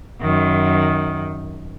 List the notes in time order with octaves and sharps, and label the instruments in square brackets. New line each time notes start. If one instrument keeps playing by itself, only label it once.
[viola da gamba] F#2 D#3